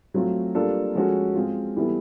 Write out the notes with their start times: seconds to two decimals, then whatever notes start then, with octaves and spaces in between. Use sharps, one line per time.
0.14 F#3 A3 C4 F4
0.55 G3 A#3 D4 F4 A4
0.95 F3 G#3 C#4 F#4 A4
1.35 G#3 C4 F4
1.76 E3 G3 B3 E4 A4